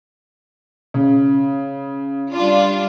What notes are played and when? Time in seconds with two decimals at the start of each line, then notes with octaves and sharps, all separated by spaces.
0.94 C#3
2.33 G3 D4 F4